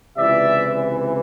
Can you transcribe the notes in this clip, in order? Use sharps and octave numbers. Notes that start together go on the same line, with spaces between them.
C#2 C3 E3 D5 E5